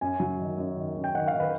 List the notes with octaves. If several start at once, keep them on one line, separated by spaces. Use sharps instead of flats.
F#2 G#5
F#3
D#3
F#2
D#3
F#2
G5
D#3 F#5
F5
D#3
B4